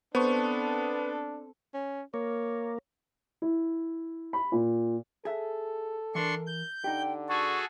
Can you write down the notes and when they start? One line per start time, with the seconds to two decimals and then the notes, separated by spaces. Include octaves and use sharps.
0.15 B3 C4 D4 A4 C5 C#6
1.74 C#4
2.14 A#3 C#5
3.42 E4
4.33 B5
4.52 A#2
5.25 G#4 A4 E5
6.15 E3 D4 A#4 C6 C#6
6.47 G6
6.84 D3 D#4 G4 G5
7.29 F#4 G#4 A4 C#6